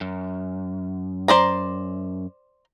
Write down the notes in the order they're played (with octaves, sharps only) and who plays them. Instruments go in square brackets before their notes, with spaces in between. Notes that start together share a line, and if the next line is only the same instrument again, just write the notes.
[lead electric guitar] F#2
[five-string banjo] C5 D5 A#5